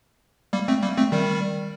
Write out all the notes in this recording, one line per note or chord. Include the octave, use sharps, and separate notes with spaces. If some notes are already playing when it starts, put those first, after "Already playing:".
G3 A#3
A3 C4
G3 A#3
A3 C4
D#3 G3